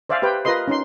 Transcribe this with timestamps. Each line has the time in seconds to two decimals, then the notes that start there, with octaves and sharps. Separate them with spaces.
0.09 C5 D5 E5 F5 G#5
0.22 G4 B4 C5 G5
0.45 F4 A#4 B4 D#5 C6
0.68 C#4 D#4 C6